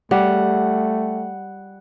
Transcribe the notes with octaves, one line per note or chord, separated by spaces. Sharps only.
G3 A3 F#5